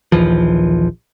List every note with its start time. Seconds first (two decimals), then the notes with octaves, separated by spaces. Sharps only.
0.12 A#1 D#2 E3 F3